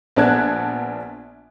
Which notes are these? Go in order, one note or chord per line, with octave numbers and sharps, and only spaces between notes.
A#1 B3 D4 A5 F#6 G#6